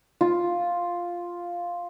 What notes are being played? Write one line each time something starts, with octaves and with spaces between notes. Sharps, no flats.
F4